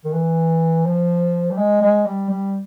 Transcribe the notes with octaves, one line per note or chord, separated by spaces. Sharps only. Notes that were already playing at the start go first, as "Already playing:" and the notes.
D#3
E3
F3
G3
G#3
G#3
G3
G3